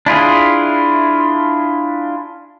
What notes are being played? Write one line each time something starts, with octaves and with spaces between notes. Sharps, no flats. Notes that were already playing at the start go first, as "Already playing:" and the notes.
D4 E4 F4 G#4